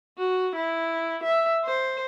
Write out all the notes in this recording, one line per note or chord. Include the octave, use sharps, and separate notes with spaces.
F#4
E4
E5
C5